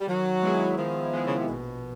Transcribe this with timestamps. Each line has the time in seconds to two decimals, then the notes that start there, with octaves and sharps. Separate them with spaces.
0.01 G3
0.07 D#3 F#3
0.42 G#3 B3 E4 G#4
0.78 D#3 F3
1.13 G#3 B3 E4 G#4
1.26 C#3
1.37 C3
1.49 A#1 B2